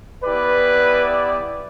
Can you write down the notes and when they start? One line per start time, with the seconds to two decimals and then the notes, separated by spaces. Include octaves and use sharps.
0.24 B3 E4 G4 B4 D5